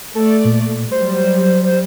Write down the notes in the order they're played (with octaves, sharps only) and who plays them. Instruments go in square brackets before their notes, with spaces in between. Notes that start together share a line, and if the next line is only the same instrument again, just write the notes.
[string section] A3 D5 [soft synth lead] A4
[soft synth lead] A#2
[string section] F#3 G3 [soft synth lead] C5